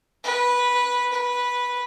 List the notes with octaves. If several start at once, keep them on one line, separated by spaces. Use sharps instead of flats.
B4
B4